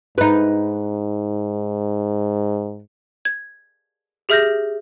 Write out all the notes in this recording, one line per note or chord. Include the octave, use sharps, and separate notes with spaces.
G#2 D#4 B4
G#6
G4 G#4 E5 F6 G6 A#6